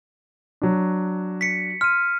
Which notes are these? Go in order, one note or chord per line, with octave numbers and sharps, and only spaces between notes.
F#3 D4
B6 C#7
C6 F6 D#7